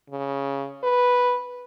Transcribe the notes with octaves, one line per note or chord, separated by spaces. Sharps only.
C#3
B4